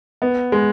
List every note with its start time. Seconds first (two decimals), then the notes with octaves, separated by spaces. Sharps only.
0.22 B3
0.52 G#3